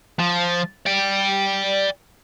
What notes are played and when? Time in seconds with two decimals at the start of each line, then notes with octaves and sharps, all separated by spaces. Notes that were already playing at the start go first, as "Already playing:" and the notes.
0.19 F3
0.86 D5 G5